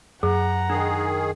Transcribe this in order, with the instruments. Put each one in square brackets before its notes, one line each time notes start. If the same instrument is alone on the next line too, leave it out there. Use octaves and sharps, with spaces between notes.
[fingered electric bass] F#2 [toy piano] G#4 [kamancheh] F#5 A#5
[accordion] D#3 G#4 [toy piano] D4